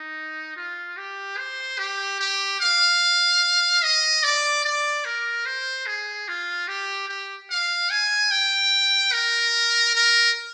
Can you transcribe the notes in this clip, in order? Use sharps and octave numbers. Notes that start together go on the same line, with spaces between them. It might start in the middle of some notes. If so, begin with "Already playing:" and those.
Already playing: D#4
F4
G4
C5
G4
G4
F5
D#5
D5
D5
A#4
C5
G#4
F4
G4
G4
F5
G#5
G5
A#4
A#4